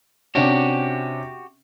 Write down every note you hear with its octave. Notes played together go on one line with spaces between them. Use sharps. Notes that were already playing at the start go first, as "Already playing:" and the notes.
C3 C#4 D4 F#4 G4